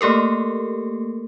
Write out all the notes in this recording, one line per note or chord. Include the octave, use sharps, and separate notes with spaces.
A3 A#3 G4 A4 A#4